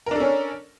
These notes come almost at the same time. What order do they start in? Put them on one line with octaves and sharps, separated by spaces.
A#4 D4 A4 C#4